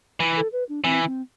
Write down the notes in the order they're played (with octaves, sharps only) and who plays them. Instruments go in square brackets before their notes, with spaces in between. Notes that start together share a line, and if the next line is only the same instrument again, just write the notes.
[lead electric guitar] E3
[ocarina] A4
B4
D4
[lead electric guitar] E3 [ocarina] C4
[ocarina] C4